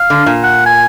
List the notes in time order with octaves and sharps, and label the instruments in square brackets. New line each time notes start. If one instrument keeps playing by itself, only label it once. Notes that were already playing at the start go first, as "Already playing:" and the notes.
Already playing: [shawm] F5
[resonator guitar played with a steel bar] D3
A#2
[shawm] F#5
G#5